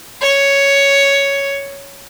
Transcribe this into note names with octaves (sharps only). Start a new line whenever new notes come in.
C#5